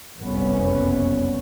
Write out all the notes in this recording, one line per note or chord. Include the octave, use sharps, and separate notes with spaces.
F#1 C2 F2 G3 B3 C#4